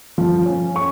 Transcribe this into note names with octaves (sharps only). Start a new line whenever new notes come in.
F3
C#4
C#6